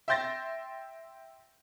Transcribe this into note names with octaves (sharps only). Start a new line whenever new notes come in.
E5 G5 C6 G6 A6 A#6